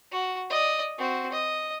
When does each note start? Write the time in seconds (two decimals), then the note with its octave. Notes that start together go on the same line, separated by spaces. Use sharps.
0.11 F#4
0.50 D5 D#5
0.98 C4 F#4
1.32 D#5